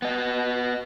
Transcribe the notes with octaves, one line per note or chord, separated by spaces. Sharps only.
B3 D#5